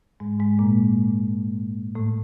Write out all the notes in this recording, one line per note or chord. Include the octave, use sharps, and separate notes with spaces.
G#2 G#3
G#2 G#3
A#2 A#3
A2 A3